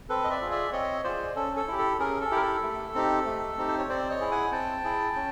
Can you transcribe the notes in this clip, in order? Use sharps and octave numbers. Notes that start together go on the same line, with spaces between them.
C4 A4 B4
D#5
D5 E5
F4 G#4
D5 E5
C4 C#5 D#5
F4 G#4 C5 D5
C#4 A4
A4
E4 G4
A4
C#4 G#4 A#4
A4
E4 G4 A#4
A4
A3
C4 D#4 G4
A3
C4 D#4 G4
C5
C#5
C4 C5 D5
C#5 D#5
E4 G#4
F#5 G#5
C4 G5 A5
E4 G#4
C#4